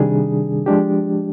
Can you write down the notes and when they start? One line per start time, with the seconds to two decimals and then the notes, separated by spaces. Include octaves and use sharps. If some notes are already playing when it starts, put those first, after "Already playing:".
Already playing: C3 D#3 G3 D4 G#4
0.66 F3 G#3 D4 G4